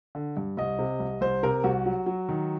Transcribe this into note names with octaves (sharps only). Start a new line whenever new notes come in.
D3
G2
C2 D#5
C3
C2
C2 C5
C3 A#4
C2 F#4
F#3
F#3
D#3